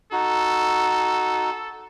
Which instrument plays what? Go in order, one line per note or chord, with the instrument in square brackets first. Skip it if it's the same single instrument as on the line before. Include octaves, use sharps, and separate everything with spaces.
[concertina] D#4 F#4 [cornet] A4